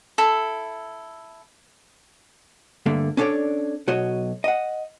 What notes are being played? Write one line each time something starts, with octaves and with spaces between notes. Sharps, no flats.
E4 A4
G2 D3 A3 A#3
C#4 D4 A4 B4 C#5 D5
B1 F#4 C#5 D#5
D#5 F#5